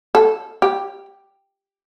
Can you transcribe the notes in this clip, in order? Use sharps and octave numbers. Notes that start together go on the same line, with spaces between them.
A4
G4